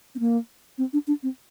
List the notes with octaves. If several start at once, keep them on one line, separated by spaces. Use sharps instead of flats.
C4
A#3
C4
D4
D4
C4